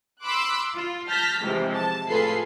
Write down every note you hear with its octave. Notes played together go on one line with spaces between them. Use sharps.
B5 C6 D6 E6 F#6
F4
A5 F6 G6 A#6 B6
G#2 C3 E3 F3
A5
A2 F4 G#4 A4 B4 C7